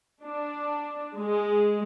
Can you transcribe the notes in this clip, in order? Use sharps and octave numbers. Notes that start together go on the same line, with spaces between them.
D4
G#3